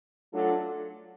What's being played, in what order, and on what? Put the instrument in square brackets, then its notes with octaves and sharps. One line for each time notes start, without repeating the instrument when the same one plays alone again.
[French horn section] F#3 A3 D4 F4 A4